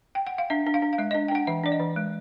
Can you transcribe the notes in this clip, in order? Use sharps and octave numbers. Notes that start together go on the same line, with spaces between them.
G5
F#5
F5
D4 E5
D4
F5
D4
F5
G#3 E5
D#5
D4
G5
D4 F#5
E3 E5
D4 D5
D#5
E3
G#3